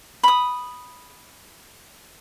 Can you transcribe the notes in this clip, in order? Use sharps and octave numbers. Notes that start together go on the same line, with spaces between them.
B5 D#6